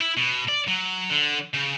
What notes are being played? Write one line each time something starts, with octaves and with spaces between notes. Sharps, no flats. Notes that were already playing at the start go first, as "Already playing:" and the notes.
E4
B2
D5
F#3
D3
C#3